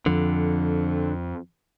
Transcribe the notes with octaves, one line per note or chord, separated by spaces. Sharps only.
F2 D3 F3